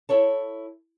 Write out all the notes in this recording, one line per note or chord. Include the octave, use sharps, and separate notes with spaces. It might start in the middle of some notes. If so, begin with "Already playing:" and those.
E4 A4 C#5 A5